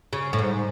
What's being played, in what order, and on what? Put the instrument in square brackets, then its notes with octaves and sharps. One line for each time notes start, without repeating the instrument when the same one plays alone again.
[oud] C#3
A2
G#2